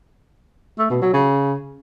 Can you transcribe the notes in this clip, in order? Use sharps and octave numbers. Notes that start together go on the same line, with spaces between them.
A3
B2
F#3
C#3